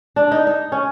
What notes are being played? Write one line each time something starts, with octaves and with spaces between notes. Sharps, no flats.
D4
D#4
D#4
C#4